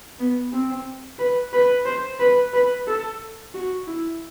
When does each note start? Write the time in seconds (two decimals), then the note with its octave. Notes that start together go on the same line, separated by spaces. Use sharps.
0.19 B3
0.52 C4
1.19 B4
1.53 B4
1.85 C5
2.20 B4
2.53 B4
2.87 A4
3.54 F#4
3.87 E4